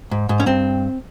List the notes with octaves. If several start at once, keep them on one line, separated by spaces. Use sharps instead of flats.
G#2
G#2
C#4
G2 C4